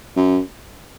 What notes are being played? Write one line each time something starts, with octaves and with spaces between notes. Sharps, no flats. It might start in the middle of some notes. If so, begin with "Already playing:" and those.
F#2